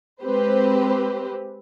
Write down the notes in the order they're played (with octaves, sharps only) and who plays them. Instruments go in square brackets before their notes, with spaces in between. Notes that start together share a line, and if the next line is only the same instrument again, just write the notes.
[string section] G#3 C4 G4 B4 C5